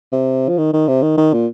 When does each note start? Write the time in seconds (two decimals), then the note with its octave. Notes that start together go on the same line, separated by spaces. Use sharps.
0.12 C3
0.49 F3
0.58 D#3
0.73 D#3
0.88 C3
1.03 D#3
1.17 D#3
1.33 A#2